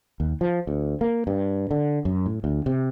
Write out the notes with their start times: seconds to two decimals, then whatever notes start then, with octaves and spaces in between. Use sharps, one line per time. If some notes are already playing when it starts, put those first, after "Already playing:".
0.20 D#2
0.41 F3
0.67 D2
1.01 A#3
1.27 G2
1.71 D3
2.05 F#2
2.26 A2
2.44 D2
2.66 C3